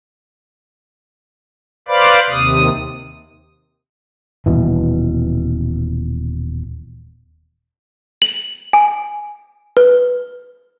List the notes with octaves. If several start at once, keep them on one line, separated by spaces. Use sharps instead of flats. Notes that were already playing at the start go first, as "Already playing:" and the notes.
B4 C5 D5 F5 B5 D6
D#2 C3 D#6
D#1 B2 E3
F#7
G#5
B4